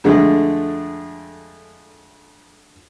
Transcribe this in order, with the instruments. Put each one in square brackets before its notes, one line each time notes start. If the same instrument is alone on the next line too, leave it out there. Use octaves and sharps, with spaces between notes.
[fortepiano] F2 D3 G#3 A3